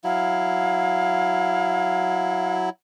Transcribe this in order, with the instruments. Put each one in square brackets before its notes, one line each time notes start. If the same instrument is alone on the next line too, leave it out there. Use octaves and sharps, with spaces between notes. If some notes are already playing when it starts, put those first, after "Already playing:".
[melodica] F#3 E4 [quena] F5